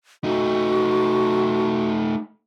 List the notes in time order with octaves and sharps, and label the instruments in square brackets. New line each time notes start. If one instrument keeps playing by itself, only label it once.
[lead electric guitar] A3 D#4 [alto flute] F#4